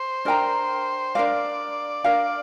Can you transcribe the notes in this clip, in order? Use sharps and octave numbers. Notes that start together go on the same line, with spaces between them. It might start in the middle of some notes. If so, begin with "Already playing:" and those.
Already playing: C5
D4 A#4 G5 A#5
D4 A#4 D5 F5
D4 A#4 F5